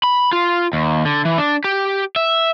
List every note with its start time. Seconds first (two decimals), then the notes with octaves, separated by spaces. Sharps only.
0.03 B5
0.33 F4
0.73 D#2
1.05 D3
1.25 E3
1.38 D4
1.64 G4
2.16 E5